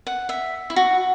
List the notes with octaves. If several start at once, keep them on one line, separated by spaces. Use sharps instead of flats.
F#5
E5
E4
F#4